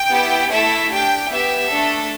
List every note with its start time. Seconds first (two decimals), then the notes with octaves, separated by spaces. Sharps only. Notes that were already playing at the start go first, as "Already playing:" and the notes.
Already playing: G5
0.11 B3 E4 G4
0.51 A3 E4 A4 E5
0.90 D4 G4 G5
1.30 B3 G4 E5
1.70 A3 D4 A4